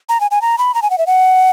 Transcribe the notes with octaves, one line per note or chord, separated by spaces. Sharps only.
A#5
G#5
G#5
A#5
B5
A#5
G#5
F#5
E5
F#5